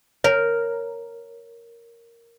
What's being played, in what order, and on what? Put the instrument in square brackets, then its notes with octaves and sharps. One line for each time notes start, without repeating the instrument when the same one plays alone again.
[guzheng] A#4 [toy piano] C#5